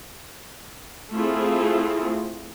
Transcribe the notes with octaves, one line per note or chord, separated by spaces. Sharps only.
A3 C4 E4 F4 G#4